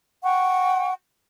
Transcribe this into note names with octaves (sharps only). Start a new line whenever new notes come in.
F#5 G5 C#6